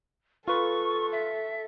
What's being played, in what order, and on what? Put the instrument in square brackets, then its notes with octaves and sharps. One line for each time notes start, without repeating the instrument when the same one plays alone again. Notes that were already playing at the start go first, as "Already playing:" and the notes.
[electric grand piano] F4 B4 [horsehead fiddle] A4 [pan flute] C#6
[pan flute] E5